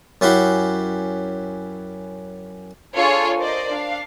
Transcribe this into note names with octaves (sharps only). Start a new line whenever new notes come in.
F#2 C#4 E4 F#4 G4 C6
D4 F4 G#4 A4 C#5 G#5
A#4 C5 D5 D#5
D4 F5